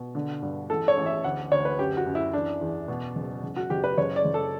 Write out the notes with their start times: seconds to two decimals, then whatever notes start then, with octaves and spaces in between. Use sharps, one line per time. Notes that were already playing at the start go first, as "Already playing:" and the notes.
Already playing: B2
0.15 D3
0.42 G2
0.70 A1 A4
0.88 C#5
0.97 A1
1.06 E5
1.24 D2 F#5
1.52 D2 C#5
1.65 B4
1.79 F#2 G4
1.97 F#4
2.06 F#2
2.15 E4
2.33 E3 D4
2.61 E2
2.88 B2
3.16 F#1
3.43 F#1
3.56 F#4
3.70 F#1 G4
3.84 B4
3.97 F#1 C#5
4.16 D5
4.25 F#1
4.34 A4